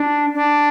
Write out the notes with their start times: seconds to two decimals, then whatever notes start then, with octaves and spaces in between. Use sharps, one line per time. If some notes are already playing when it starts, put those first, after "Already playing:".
Already playing: D4
0.34 D4